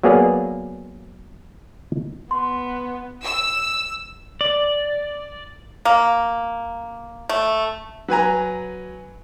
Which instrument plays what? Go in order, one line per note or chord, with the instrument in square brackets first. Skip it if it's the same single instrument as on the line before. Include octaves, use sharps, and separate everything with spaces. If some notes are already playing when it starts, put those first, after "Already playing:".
[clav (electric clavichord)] F#3 A#3 B3 G#4 D5 F5
[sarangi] B3 [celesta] C6
[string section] E6
[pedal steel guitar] D5
[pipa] A#3
A3
[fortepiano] F#3 B4 G#5 A#5